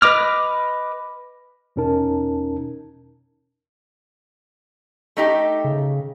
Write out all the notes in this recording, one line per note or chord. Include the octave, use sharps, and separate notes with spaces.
B4 D#5 D6 F6
E2 B2 C#4 D#4 A#4 A5
A3 D#4 G4
C#3